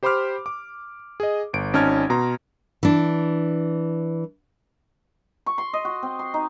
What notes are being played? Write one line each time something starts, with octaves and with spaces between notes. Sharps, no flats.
G4 C5 B5 C6 D6 F6
D6
G#4 D#5
G1 D7
G#1 C#4 D#4 A5 F6 G#6
B2 A#5 C6
E3 D4
C#6
C6
D#5
F#4
C4
C6
D#4